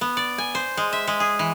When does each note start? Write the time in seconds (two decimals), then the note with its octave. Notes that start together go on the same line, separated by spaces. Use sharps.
0.01 B3
0.17 D5
0.38 G#5
0.55 C5
0.77 G#3
0.93 E5
1.07 G#3
1.20 G#4
1.39 E3